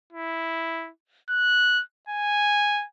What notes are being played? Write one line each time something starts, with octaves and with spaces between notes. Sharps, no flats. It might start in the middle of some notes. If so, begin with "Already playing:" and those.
E4
F#6
G#5